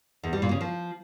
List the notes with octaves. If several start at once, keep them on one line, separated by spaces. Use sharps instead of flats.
E2
G3
A#2
C#3
F3